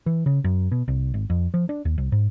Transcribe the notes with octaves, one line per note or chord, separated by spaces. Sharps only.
E3
C#3
F#2
B2
C2
G#1
F2
F3
D4
D#2
C2
G#2